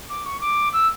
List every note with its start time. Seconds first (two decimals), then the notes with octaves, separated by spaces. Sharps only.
0.10 D6
0.26 C#6
0.41 D6
0.73 E6